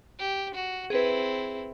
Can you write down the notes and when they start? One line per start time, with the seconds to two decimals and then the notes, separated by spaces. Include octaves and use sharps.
0.19 G4
0.54 F#4
0.90 C4 E4 G#4 B4